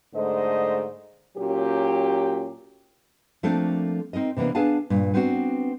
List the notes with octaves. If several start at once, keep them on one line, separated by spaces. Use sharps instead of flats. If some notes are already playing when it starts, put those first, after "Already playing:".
G#2 D3 A3 C5 D#5
A#2 F#3 C#4 G4
F3 A3 A#3 C4 D4 A4
C4 D#4 A#4 D#5
C3 E3 A#3 B3 D4
B3 D4 G#4 F5 G#5 A5
G2 A#2
B3 C4 D4 F#4